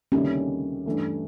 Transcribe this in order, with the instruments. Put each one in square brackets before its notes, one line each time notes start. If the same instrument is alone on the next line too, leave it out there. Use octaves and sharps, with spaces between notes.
[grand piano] D2 C3 D#3 G3 A#3 [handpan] C#4
[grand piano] G2 E3 A3